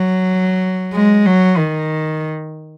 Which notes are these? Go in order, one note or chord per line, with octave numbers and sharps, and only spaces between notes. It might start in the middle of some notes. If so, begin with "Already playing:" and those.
Already playing: F#3
G#3
F#3
D#3